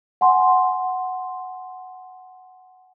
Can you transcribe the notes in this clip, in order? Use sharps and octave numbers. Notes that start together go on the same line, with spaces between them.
F#5 G#5 C6